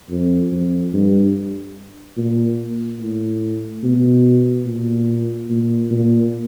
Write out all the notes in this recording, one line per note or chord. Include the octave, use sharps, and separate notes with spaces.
F2
F2
G2
A#2
A2
B2
A#2
A#2
A#2